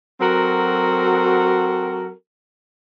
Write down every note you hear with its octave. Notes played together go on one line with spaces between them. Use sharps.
F#3 C4 F#4 A4 A#4